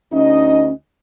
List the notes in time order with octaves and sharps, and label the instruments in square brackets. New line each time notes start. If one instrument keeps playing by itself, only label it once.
[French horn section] D2 D#4 D#5 [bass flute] C#4